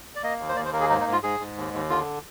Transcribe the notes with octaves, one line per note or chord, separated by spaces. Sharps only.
D5
A#3 D#5
D#2
C5
D#2 D5
C5
A#3 A#4
G#4
G#2 D#4
D#4
G#2
F4
G#2 G#4
G#2
D#2
D#2
D3 F4